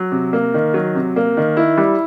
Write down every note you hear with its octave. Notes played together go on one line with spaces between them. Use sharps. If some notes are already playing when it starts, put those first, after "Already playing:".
Already playing: F#3
C3
A#3
D#3
F#3
C3
A#3
D#3
E4
G3